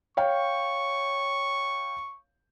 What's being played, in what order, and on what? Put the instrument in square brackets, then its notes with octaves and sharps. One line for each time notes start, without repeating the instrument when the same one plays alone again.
[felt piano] C#5 F5 G5 [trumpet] C#6